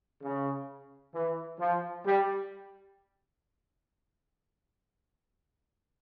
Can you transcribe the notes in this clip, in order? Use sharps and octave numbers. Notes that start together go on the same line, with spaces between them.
C#3
E3
F3
G3